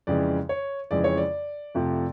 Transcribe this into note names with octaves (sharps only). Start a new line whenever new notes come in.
F2 C#3 E3 G#3 D5
C#5
F2 C#3 E3 G#3 D5
C#5
D5
F2 C3 F3 A3